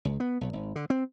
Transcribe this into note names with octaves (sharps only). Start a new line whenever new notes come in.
C#2
B3
B1
G#1
D3
C4